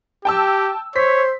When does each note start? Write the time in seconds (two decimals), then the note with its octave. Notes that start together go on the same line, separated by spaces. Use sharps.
0.25 G4 G5 A5 E6
0.96 C5 C#5 B6